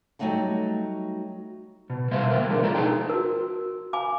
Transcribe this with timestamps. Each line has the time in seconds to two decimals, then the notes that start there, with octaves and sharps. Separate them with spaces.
0.19 F#3 G3 A3 D#4 F#5 G5
1.90 B2
2.11 G3 A#3 B4 C5 E5 F5
2.28 D2 B3 A#4 G5
2.48 B2 F3 G#3 A3 B3 D4
2.63 F4 F#4 A4 A#4 C5 D5
2.75 D#4 F4 G#4 G5
3.09 F#4 A#4
3.93 F5 G#5 B5 D6